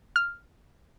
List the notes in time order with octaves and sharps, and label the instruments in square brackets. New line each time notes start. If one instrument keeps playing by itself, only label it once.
[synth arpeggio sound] F6